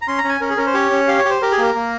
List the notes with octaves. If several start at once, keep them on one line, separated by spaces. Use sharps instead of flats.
A#5
C#4 C6
A#5
C#4
G#5
C#4 A#4
G#4
C#4 A#4
C5
G4 C#5
C#4
G4 F5
C#5
G4
C5
G4 A#4
G#4
A#3 A#4
A#3